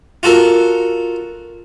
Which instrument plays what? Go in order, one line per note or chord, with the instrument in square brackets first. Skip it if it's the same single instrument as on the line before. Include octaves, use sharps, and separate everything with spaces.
[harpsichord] F4 F#4 A4 A#4